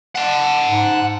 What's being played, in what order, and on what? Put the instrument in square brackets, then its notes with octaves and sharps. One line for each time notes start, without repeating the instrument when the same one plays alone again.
[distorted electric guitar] F#5 A5
[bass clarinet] G#2